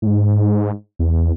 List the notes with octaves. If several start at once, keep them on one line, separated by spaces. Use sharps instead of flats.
A2
G#2
E2